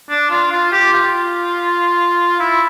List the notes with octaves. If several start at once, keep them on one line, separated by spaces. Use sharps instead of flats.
D4
F4
F4
G4
F4
E4